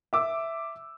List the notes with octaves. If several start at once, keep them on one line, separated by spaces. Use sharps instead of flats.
E5 D6 E6